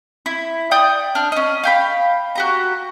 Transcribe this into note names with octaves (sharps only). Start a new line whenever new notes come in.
E4
D5 G5 D#6
D4 F6
C#4 D#5
F5 G5 B5
F#4 G4 A#5